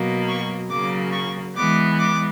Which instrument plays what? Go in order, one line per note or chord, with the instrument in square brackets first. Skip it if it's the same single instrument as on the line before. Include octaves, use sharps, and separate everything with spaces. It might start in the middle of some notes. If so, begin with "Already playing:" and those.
Already playing: [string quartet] B2 F#3 A#3
C#6
C#3 F#3 A#3 D6
C#6
E3 G#3 B3 D6
D6